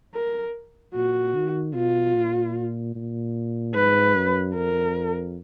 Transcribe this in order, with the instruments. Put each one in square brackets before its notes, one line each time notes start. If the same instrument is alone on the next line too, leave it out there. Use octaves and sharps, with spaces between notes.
[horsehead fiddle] A#4
[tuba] A#2 [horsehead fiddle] F#4
[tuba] D#3
[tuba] B2 [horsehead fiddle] F4
[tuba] A#2
A#2
[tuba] G#2 [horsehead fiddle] B4
[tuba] F#2
[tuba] F2 [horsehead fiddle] A#4